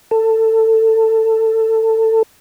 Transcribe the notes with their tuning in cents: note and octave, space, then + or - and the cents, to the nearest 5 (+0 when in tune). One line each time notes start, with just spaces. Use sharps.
A4 +20